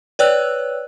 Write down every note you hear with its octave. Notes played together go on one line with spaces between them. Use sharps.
B4 C#5 D5 G5 E6 F#6